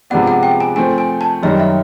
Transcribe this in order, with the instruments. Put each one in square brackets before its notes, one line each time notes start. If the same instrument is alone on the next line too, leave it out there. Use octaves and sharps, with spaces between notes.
[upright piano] C3 F3 G#3 B3 D4 [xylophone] F#5
[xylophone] F#5
G5
G#5
[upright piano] F3 A3 C4 [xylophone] G#5
[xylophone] G#5
A5
[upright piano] F#2 D#3 G3 [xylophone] D#5
[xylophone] E5